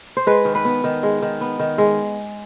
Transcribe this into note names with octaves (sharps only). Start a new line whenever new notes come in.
C5
G#3 B4
D#3
B4
B3
D#3
G#3
D#3
B3
D#3
G#3